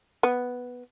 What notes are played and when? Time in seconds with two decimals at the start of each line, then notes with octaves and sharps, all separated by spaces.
0.23 B3